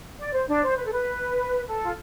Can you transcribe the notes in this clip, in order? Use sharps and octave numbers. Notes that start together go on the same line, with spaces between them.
D5
C5
D4 D5
C5
B4
A4
B4
A4
F4